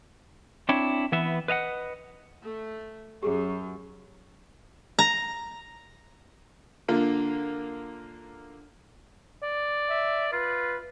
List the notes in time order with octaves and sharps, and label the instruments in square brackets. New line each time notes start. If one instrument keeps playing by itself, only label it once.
[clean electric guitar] C4 D4 E4 C#5
E3 B3 E5
B4 D#5 F5 F#5
[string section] A3
[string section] F#2 [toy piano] G4 G#4
[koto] A#5
[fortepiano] D3 A#3 F4
[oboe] D5
[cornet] E5
[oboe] F4 [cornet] B4